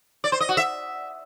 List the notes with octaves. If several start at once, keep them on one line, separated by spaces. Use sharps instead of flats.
D5
C5
D#5
F#4
E5